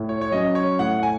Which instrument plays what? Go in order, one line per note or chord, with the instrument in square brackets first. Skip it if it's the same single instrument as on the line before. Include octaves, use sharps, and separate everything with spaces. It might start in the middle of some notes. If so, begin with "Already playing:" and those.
Already playing: [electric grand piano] A2
[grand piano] C#5
C#5
[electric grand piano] F#3 C#4 [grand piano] D#5
[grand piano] C#5
[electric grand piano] A2 [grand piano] F#5
[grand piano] G#5